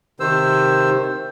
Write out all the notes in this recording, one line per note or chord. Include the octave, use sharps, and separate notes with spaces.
C3 D#3 C5 E6